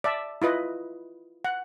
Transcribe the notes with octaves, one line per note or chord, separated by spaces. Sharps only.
D5 E5 A5
E4 F4 B4 D#5
F#5